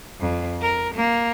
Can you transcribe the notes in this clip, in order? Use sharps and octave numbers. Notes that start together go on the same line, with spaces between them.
F2
A#4
A#3